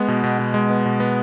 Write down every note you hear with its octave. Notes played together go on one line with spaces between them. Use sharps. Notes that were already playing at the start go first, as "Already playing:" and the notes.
Already playing: G#3 B3
B2
B2
B2
G#3
B3
B2
B3